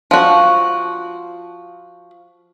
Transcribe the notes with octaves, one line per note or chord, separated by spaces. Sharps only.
F3 F#4